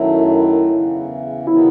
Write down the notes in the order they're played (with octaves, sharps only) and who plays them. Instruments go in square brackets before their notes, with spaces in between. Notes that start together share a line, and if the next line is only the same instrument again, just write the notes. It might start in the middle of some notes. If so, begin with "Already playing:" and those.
Already playing: [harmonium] F#2 D#3 F#3 A3 [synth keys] E4
[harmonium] E2 C#3 E3
[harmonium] C3 D#3 F#3 B3 [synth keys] E4